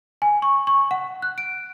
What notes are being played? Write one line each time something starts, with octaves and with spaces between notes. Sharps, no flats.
G#5
C#6
C#6
F#5
F#6
D7